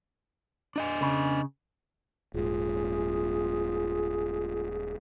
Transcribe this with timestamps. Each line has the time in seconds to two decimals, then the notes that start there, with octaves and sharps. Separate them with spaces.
0.76 D4 D#5 G#5
1.02 C#3
2.34 D#1 G#2 F4 G#4